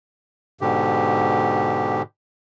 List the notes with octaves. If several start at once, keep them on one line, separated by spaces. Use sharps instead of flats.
G#2 B2 D3 G4